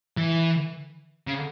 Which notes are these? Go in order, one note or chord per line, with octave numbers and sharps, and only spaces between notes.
E3
C#3